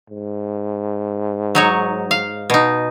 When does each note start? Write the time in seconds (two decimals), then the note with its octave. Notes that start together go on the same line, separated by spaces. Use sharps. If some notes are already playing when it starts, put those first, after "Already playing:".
0.10 G#2
1.55 F#3 D#4 C#5
2.11 F5
2.50 B2 D#4